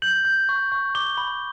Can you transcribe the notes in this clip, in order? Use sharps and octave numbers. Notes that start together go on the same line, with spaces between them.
G6 F#7
G6
C#6
C#6
D6 G7
B5